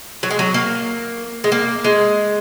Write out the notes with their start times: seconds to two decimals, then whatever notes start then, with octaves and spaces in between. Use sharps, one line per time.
0.23 F#3
0.31 G#3
0.39 F#3
0.54 A#3
1.44 G#3
1.52 A#3
1.84 G#3